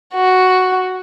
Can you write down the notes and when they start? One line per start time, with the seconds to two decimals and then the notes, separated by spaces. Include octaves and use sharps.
0.14 F#4